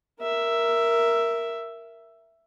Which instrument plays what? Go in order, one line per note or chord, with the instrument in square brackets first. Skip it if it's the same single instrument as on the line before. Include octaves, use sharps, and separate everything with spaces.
[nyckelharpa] A#4 E5